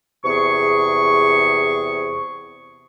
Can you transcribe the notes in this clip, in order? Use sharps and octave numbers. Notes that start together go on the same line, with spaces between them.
E2 C3 G#4 C#6